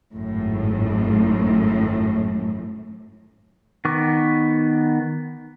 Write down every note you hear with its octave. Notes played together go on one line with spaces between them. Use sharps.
G#1 F#2 A2
D#3 B3 C#6 D6